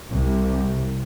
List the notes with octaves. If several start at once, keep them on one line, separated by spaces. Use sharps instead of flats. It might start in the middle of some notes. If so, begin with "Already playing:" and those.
C2